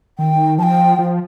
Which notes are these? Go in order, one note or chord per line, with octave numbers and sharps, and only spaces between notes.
D#3 G5
F3 G5 A5
F3